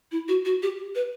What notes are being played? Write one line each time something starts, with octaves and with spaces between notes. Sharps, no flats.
E4
F#4
F#4
G4
B4